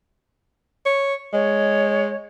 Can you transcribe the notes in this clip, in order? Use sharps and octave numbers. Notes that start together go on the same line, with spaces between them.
C#5
G#3 C#5